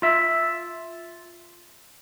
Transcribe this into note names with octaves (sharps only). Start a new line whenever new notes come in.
F4 E5